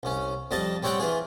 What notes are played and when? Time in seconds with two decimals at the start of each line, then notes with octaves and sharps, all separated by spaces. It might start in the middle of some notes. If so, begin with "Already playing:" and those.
0.03 C2 C#4
0.51 F2 G3 D#5 A5
0.83 G3 C4 C#5 F#5 G5
1.00 E3 F4 G#4